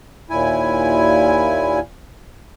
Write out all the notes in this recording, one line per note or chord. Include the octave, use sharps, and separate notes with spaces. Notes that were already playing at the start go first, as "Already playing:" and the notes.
D#2 A#2 E4 G#5